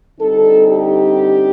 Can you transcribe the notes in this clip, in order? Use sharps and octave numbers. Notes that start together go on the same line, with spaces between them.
D3 G3 C4 D#4 A4
G4